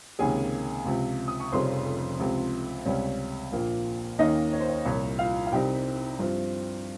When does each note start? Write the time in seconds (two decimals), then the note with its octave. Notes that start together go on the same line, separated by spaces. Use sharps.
0.19 C#2 C3 D#3 A#3 C#4 G#4 G#5
0.85 C#2 C3 F3
1.28 D#6
1.40 C#6
1.52 F1 F2 C#3 G3 C#4 C5 C6
2.19 C#2 C3 F3
2.85 C#2 C3 G3 C#4
3.52 A#1 A#2 F3 A#3
4.19 D#2 D#3 A#3 C#4 D#4 D#5
4.52 C#5
4.60 C5
4.69 C#5
4.85 C2 A#2 F3 C#5
5.19 F4 F5
5.46 F5
5.52 C2 C3 G3 C4 D#4 G4 G5
6.19 G2 F3 C4